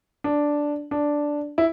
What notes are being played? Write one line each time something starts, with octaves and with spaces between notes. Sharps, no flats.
D4
D4
E4